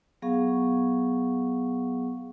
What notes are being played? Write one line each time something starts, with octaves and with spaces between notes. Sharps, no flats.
F#3 B3 G#4 F5 F#5 C#6